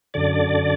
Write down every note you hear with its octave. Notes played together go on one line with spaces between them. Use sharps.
F#2 D3 D5